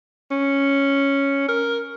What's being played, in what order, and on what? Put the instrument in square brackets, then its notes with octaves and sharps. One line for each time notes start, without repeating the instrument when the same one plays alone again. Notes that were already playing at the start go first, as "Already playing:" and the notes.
[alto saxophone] C#4
A#4